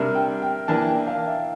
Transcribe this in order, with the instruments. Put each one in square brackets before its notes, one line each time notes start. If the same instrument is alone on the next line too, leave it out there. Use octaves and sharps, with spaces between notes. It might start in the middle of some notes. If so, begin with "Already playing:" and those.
Already playing: [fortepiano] C3 G3 D4 [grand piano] A#4
[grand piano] G5
G5
[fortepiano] E3 A#3 D4 [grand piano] A5
[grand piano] G5
F5
E5